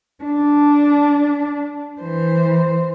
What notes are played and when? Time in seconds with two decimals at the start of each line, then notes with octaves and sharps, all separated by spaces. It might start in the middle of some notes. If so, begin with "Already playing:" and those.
0.24 D4
2.01 E3 C5